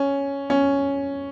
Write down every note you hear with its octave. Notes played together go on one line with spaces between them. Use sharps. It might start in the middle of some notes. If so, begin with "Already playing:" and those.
Already playing: C#4
C#4